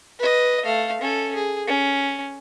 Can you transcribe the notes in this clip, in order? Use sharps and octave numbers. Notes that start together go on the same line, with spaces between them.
B4 D#5
A3 F5
C#4 A4
G#4
C#4